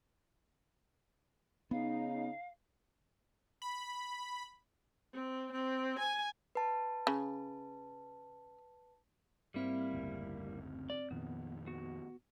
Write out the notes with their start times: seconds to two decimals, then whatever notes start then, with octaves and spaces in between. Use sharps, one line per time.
1.71 C#3 B3 D#4 F5
3.62 B5
5.14 C4
5.52 C4
5.99 G#5
6.55 B4 A5
7.07 C#3
9.54 G#2 G3 A#3 C4 E4 F6
9.93 F#1 D2
10.90 D5
11.11 F2 A#2 D#3 B3
11.67 B3 F#4